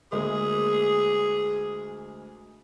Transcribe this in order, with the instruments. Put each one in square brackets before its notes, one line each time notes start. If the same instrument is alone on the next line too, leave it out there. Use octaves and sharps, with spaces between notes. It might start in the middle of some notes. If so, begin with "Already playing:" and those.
[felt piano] D2 G#3 A#3 [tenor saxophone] G#4